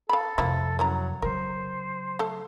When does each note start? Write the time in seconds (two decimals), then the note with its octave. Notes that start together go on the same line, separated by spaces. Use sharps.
0.09 A4 F5 B5
0.38 F2 C3 F3 A#3 E4
0.79 F#3 C#4 E4 A#5
1.22 C#3 F#3 A#4 C5
2.19 A3 A4